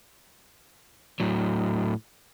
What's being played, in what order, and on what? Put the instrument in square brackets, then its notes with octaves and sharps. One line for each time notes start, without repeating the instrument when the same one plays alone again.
[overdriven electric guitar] A2 F#3